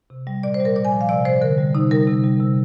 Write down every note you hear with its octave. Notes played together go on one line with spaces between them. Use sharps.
C3
G3
A#2 D5
C5
G3
A#4
A#2 D5
G#5
F3
F5
C3 D5
F3 C5
D3 A#4
G3
C3 D#4
G3 A#4
C3
G3
C3